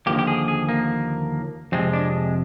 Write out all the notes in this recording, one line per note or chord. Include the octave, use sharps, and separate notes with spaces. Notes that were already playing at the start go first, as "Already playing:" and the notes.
D#2 D3 F3 A#3 G4
G4
G#4
G#4
A#3
F2 C3 F3 G#3 C4
D4